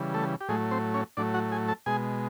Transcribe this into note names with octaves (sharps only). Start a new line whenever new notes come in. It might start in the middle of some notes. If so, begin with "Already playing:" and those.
Already playing: C#3 E3 G3
A3 A4
G4
A2 F#3 G#3 A3 G#4
C4 C5
C#4 C#5
A2 F#3 A3 D4 D5
F#4 F#5
G#4 G#5
A4 A5
B2 G#3 G#4 G#5